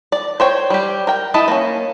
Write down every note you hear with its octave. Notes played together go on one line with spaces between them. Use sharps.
D5
C5 C#5 G5
G3 G4
A#4 G5
E4 D#5 A5
A#3 C#4